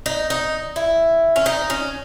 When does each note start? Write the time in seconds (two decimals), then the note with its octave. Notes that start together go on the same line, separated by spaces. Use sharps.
0.06 D#4
0.30 D#4
0.76 E4
1.36 C#4
1.46 D#4
1.70 C#4